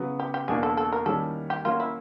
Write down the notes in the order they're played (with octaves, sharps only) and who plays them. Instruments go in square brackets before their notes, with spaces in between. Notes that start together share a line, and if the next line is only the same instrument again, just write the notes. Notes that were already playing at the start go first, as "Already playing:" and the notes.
Already playing: [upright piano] C#3 F#3 B3
[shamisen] G4
G4
[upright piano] E2 B2 F#3 A#3 D4 [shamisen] G#4
[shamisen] A4
A4
A#4
[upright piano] D#3 G3 A#3 C#4 [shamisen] A4
[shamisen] G4
[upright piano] F#3 A#3 C#4 F#4 [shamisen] F4
[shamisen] E4